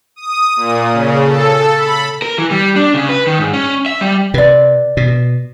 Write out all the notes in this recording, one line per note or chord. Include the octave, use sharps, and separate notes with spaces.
D#6
A#2
C#3
A4
B5
A#4
E3
G3
D4
C#3
B4
D#3
G#2
C#4
E5
G3
C3 B4 D5
B2